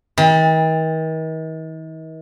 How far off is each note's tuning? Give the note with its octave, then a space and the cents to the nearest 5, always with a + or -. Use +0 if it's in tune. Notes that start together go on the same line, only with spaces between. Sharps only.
D#3 +45